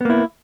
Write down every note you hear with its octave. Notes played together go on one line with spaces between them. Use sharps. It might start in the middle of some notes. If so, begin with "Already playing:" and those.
A#3 B3 E4